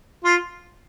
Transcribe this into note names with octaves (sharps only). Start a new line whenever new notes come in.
F4